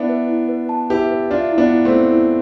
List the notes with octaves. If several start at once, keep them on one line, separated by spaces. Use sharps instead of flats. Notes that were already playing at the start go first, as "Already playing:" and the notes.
Already playing: B3 D4 E4 E5
B4
E4
B4
A5
E4 G4 B4
B4
D4 F4 E5
E4
B3 D4
E4
A3 C4
E4
E4